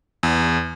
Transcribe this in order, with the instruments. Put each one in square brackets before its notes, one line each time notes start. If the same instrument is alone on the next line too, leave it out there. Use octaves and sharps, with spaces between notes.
[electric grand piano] E2